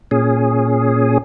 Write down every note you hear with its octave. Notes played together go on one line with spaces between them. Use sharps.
A#2 C#4 G#4